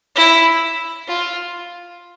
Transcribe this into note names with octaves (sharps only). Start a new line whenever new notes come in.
E4
F4